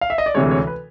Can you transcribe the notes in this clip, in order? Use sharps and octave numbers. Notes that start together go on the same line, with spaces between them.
F5
E5
D#5
D5
D2 C3 E3 G#3 C#5
C#5
B4